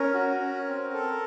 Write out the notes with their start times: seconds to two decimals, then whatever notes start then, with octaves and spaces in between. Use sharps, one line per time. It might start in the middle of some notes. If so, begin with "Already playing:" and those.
Already playing: C#4 A#4
0.14 F#4
0.40 C#4
0.67 C4
0.94 A4